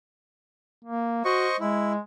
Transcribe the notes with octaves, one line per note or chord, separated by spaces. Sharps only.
A#3
F#4 C5 D#5 C#6
G#3 E4